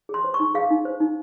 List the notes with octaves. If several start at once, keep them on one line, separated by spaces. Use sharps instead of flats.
G#4 C6
C5
C#6
D#4
G#4 F5
D#4
C5
D#4